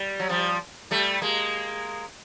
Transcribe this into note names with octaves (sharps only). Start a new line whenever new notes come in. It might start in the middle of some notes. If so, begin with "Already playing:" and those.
Already playing: G3
F#3
F3 G3
G3 A3
G#3 A#3